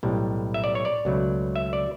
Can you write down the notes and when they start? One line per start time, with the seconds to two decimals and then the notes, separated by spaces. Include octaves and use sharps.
0.03 B1 A2 G3
0.54 E5
0.64 D5
0.75 C#5
0.85 D5
1.05 C#2 B2 F#3 A3
1.56 E5
1.73 D5